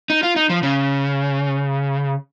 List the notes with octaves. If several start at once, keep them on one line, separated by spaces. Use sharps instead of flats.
D#4
F4
D#4
F3
C#3